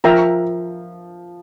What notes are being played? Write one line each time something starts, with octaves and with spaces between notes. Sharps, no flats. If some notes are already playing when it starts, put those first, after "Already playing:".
F3 A#4 E5 G5 A#5